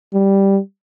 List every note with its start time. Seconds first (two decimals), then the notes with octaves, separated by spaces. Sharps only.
0.14 G3